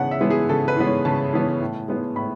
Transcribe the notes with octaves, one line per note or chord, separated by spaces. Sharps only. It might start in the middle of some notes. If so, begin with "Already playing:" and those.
Already playing: C#3 E3 G#3 B3 F#5 A5
E5
E3 G#3 B3
G#4
C#3 A4
B4
E3 G#3 B3
C#5
C#3 A5
E3 G#3 B3
A2
G#3 B3
A2 B5